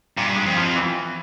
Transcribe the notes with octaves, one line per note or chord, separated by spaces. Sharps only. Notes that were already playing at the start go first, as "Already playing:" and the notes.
G2 A#2
G#3
F2
F3
E3